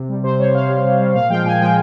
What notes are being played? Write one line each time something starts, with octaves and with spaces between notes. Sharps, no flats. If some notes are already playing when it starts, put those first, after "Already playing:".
Already playing: C3
G3
C3 C5
G3 C#5
C3 F5
G3
C3
G3
A#2 F5
F3 G#3 G5
A#2 G#5
F3 G#3 G5